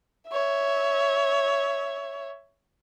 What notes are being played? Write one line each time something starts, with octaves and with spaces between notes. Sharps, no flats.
C#5 E5